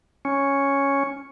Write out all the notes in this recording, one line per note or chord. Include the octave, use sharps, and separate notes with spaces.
C#4